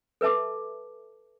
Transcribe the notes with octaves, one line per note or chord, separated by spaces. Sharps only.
A4 B4 E5 A5 D6